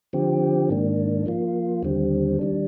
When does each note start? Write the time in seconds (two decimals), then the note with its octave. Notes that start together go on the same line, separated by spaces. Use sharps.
0.13 D3 F3 C4 G4
0.69 G#2 D#3 A#3 D4
1.26 F3 A#3 F4
1.83 D#2 D3 G3 C4
2.39 D#3 G3 D4